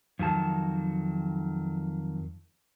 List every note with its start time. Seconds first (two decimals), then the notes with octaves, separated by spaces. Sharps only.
0.19 F2 D#3 F#3 A5